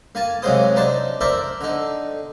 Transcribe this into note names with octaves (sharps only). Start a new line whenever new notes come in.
A#3 G#5 A5
C3 F#3 G#3 A#3 C5 D#6
D4 D#4 C5 A5
A#4 C5 D5 E5 A5
D3 D#4